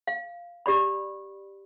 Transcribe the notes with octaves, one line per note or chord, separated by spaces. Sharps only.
F5
G4 D5 B5